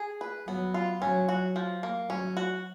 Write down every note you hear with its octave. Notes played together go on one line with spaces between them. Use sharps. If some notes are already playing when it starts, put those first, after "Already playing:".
Already playing: G#4
B4
F#3 B3
F4
F#3 C#4
F#4
F3
A#3
F#3 C#4
F#4